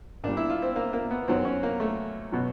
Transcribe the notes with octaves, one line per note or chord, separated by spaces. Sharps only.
A#2 G3 D4
E4
F4
C4
A#3
A#3
B3
F#2 D#3 F#3 C4
C#4
A#3
A3
B2 F#3